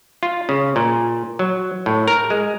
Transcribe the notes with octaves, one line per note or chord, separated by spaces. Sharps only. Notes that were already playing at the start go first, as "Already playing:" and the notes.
F4
C#3
A#2
F#3
A2
A#4
G#3